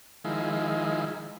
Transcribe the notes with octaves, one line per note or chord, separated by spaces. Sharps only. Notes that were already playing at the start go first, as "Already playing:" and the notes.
D#3 F3 G#3 E4